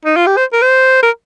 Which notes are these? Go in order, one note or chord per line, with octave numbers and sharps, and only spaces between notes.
D#4
F4
G4
C5
A#4
C5
A#4